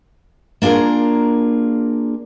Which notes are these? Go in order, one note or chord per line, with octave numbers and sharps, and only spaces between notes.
A#3 D4 F4 G#4 A#4